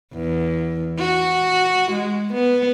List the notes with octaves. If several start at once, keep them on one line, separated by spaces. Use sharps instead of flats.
E2
F#4
G#3
B3